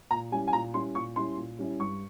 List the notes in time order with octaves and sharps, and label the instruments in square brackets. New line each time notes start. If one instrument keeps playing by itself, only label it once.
[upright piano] A#2 A#5
G3 C#4 E4 G#5
G#5
A#2 A#5
G3 C#4 E4 C6
A#2 C#6
G3 C#4 E4 C6
A#2
G3 C#4 E4
G2 C#6